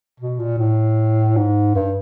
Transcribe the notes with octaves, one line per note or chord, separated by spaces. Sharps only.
B2
A#2
A2
G#2
G2